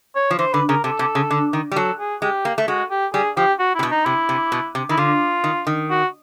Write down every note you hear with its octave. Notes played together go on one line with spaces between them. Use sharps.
C#5
F3
E3 C5
D3 B4
C#3 A#4
C3 A4
C3
C#3
D3
D#3
G3
F#3 A4
G#4
G#3 G4
A#3
A3
G#3 F#4
G4
G3 G#4
F3 G4
F#4
C3 E4
B2
D#4
C3 E4
C3
B2
C3
D#3 E4
D3 F4
D#3
D#3
F#4